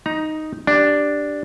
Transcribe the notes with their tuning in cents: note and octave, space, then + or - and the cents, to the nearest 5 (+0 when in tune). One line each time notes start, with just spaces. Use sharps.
D#4 +0 A#5 +20
D4 +0 G4 +0